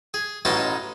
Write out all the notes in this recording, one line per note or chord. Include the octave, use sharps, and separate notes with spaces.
G#4
A1 B2 C#4 D#4 A5 C6